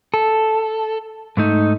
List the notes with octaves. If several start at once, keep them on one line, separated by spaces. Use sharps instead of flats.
A4
G#2 A3 D#4